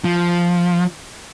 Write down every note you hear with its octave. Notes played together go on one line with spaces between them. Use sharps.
F3